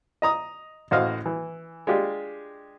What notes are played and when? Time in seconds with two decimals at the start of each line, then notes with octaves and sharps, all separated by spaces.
0.22 D#5 A#5 D#6
0.91 A1 F#4 C5 D#5 F5
1.26 E3
1.87 G#3 D4 F4 G4